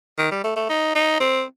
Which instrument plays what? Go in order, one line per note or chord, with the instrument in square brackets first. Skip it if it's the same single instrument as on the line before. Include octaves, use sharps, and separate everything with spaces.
[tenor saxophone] D#3
G3
A3
A3
D#4
D#4
C4